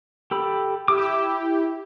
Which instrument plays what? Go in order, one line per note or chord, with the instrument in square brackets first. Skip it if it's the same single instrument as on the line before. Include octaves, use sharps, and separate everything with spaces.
[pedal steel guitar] G4 A4 B5
[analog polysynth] E4 G4 [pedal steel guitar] D6 E6